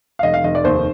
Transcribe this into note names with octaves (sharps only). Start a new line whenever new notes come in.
F5
F1 D#5
F5
F1 D#5
D5
D#2 C5